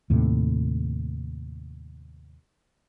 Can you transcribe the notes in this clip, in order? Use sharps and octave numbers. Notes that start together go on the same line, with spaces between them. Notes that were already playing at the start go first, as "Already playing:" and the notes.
D#2 A2 C3